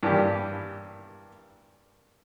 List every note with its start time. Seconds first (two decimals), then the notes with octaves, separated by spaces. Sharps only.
0.03 G2 E3 A#3 D4 G4